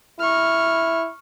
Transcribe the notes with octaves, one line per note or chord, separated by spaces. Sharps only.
E4 C#6 F6